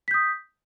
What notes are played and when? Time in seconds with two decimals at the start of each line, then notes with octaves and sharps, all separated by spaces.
0.08 B6
0.11 G6
0.14 D#6